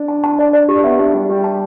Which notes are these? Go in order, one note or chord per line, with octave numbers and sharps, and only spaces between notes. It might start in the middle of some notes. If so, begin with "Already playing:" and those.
Already playing: D4
A5
A5
D5
D5
D4 G4
B3 E5
D4 G4
G3 G4
G3 G4
A5